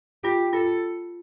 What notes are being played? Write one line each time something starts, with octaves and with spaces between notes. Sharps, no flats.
F4 G4
F4 A4